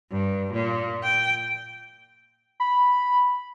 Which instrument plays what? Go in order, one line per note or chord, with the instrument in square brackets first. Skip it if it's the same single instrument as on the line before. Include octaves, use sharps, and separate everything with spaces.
[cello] G2
A#2
G5
[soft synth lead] B5